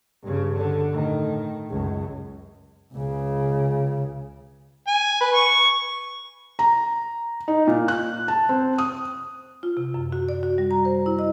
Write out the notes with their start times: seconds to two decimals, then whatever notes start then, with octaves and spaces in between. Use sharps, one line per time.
0.23 G2 C#3
0.56 D3
0.91 A2 D#3
1.69 C#2 F#2
2.94 C#2 C#3
4.87 G#5
5.21 B4
5.34 C#6
6.59 A#5
7.48 D#4
7.67 A#2
7.88 F#6
8.28 A5
8.49 C4
8.78 D#6
9.63 F4
9.77 C3
9.94 F#2
10.12 F#4
10.29 D5
10.43 F#4
10.58 G3
10.71 A#5
10.85 C5
11.06 E4
11.19 D#5